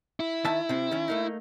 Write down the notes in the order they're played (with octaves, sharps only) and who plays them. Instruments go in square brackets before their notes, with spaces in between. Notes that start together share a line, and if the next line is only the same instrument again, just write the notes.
[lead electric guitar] E4
[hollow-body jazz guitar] D#3 E5 A5
C3 C4
D#3 C#4
A3 A#3 D#4